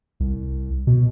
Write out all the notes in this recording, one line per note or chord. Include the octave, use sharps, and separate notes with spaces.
C2
B2